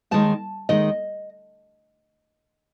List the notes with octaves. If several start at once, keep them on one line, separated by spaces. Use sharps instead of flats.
D#2 D#3 G#3 A5
D#2 D#3 G#3 D#5